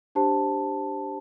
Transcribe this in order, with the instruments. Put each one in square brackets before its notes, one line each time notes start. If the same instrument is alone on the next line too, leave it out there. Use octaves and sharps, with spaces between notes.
[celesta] D4 G4 C5 A5